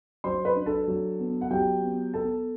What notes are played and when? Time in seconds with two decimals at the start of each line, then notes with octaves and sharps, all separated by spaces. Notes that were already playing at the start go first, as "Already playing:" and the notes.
0.24 F#3 C5 C6
0.45 B4 B5
0.56 D4
0.66 A4 A5
0.88 F#3
1.19 B3
1.41 F#5
1.51 F#3 G4 G5
1.82 B3
2.14 B3 A4 A5